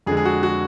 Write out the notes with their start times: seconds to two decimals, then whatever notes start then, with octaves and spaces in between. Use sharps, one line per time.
0.06 F2 D3 G#3 G#4
0.17 G#4
0.25 F#4
0.43 F#4